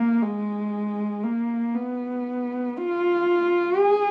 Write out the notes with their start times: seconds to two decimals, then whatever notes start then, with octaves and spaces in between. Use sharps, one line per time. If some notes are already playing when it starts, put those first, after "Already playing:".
Already playing: A#3
0.22 G#3
1.24 A#3
1.75 B3
2.77 F4
3.79 G#4